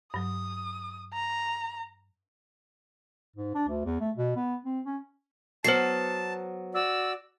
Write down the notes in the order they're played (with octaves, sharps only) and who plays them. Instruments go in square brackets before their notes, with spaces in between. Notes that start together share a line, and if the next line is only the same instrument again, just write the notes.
[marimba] G2 F#3 [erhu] D#6
[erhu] A#5
[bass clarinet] G#2
D4
D2
E2
A3
B2
B3
C4
C#4
[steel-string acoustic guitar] F#3 B3 [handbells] C5 C7 [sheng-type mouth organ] A5
[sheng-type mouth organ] F#4 D5 [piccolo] E6